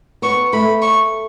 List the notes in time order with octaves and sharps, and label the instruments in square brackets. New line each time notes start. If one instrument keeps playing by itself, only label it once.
[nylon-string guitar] B3 [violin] C#6
[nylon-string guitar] A3 [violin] B5
[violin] C#6